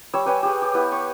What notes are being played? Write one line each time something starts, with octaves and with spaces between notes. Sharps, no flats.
G3 C#5 E6
G4 B4 C#5 G#5
G4 G#4
G4
B3 E4 B4
C#6